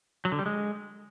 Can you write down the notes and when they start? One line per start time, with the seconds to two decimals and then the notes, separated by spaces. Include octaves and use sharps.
0.25 F#3
0.32 D3
0.39 G3
0.46 G#3